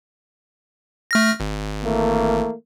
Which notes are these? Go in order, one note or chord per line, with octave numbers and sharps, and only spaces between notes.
A3 F6 A#6
G#1
E3 A3 A#3